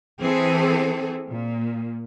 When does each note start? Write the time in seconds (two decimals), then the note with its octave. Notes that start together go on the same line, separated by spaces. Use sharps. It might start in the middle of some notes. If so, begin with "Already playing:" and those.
0.21 E3 C4 G#4 A4
1.28 A#2